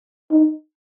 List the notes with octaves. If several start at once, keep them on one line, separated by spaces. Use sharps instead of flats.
D#4